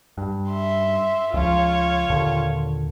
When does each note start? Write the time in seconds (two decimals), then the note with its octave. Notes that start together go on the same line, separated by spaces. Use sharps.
0.18 G2
0.50 E5 C6
1.34 C#2 F3 F4 C#5
2.10 D#2 A#2 D3